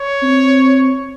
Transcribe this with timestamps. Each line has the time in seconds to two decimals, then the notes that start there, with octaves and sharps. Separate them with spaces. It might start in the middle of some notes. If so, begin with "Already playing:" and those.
Already playing: C#5
0.22 C4